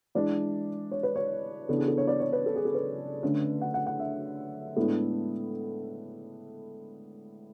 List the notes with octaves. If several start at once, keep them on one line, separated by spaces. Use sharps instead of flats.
E3 G#3 D4 D5
C#5
B4
C#5
C#3 E3 B3 D4 A4
G#4
A4
C#5
D5
C#5
B4
A4
G#4
A4
B4
D3 A3 C#4
F#5
F#5
F#5
E5
A2 G#3 B3 D4 A4